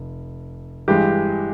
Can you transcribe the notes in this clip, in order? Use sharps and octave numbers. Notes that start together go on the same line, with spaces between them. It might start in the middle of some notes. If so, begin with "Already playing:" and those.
Already playing: F1
G2 E3 G#3 G4